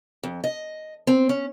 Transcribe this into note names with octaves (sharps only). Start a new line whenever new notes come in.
F2
D#5
C4
C#4